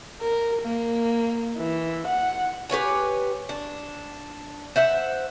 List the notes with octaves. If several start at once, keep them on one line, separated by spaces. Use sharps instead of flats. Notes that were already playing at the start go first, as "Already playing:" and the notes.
A#4
A#3
E3
F#5
G4 B4 C#5 G#5
D4
C5 E5 F#5